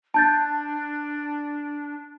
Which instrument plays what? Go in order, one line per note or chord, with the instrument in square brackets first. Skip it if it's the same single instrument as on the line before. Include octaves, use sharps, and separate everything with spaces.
[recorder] D4 [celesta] A5 G6 A6